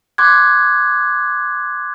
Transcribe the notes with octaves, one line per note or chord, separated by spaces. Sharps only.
C6 D6 F#6 G#6